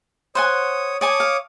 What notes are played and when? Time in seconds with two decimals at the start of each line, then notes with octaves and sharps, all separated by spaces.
0.35 C5 C#5 F#5 G#5 D#6
1.01 C#5 D5 G#5 A5 D6 D#6
1.20 F5